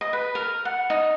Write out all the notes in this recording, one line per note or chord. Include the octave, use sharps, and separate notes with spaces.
D#5
B4
A#4
F#5
D#4